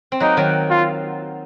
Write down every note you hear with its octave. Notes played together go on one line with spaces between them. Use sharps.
C4
F#3 A#3 D#4
D#3 F#3
F4